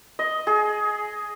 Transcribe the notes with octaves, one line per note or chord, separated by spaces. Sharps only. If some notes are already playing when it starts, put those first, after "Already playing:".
D#5
G#4